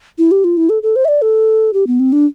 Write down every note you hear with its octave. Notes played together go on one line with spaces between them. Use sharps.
E4
G4
F4
E4
A4
A4
C5
E5
D5
A4
G4
B3
C4
D4